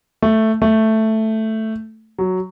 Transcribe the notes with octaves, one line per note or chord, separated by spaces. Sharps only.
A3
A3
F#3